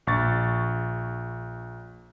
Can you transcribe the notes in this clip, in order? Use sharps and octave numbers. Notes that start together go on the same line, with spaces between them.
A#1 C#6 A6